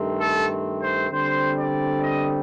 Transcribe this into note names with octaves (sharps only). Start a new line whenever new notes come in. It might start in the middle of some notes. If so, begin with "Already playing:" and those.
Already playing: G2 D#3 A3 C4
A4
C5
D3 G3 C4 C5
D5
D#5